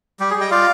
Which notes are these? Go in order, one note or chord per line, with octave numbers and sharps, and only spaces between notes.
G3 G4
G#4
G3 D#5 G5
F4 D5 F5